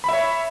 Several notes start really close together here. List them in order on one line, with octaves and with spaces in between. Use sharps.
B5 E5 C#5